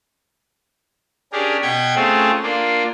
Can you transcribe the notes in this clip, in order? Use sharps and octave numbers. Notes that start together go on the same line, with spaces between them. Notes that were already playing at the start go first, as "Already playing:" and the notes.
C#4 D4 G4 G#4 A#4
B2 F#5 G5 B5 G#6
A3 C4 C#4 F4 G#4 A4
A#3 D4 F4